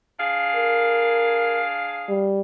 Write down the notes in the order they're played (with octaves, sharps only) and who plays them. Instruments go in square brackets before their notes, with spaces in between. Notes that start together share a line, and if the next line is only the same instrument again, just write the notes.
[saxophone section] D4 G#4 F5
[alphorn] A#4
G3